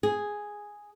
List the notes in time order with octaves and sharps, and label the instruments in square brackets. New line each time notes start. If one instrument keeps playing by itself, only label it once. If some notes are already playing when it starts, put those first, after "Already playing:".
[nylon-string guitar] G#4